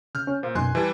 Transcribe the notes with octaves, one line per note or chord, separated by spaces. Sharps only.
C#3 F6 G6
C#4
A#2 C5 F5
F#2 B2 D#4 G#5 C6 F#6
E3 G3 G#5 A5